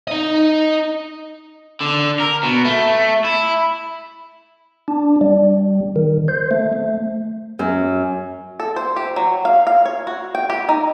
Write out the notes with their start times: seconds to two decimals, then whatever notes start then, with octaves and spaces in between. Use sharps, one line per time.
0.07 D#4 D#5
1.81 D3
2.20 A#4
2.43 B2
2.65 A3
3.25 E4
4.88 D4
5.21 G3
5.96 D#3
6.28 C5
6.51 A3
6.73 A3
7.59 F#2
8.60 A4
8.76 C5
8.96 G4
9.16 F#3
9.45 F5
9.67 F5
9.85 C#5
10.07 F#4
10.35 G5
10.50 G4
10.69 D#4